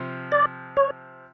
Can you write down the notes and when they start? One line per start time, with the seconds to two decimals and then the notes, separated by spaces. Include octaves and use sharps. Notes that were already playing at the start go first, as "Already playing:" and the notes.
Already playing: C3 F3
0.32 D5
0.77 C#5